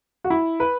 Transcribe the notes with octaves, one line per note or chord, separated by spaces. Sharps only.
F#4
E4
B4